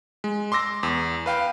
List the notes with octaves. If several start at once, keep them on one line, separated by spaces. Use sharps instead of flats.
G#3
C6 D6 E6 A#6
E2
B4 F5 G5